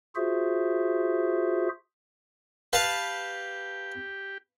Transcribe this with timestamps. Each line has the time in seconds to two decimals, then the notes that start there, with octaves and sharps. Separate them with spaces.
0.16 F4 F#4 G#4 C5 E5
2.73 G4 B4 F5 A5